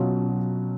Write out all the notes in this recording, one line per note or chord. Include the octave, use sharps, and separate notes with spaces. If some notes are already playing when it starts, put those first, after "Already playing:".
Already playing: B2 F#3 C#4 F4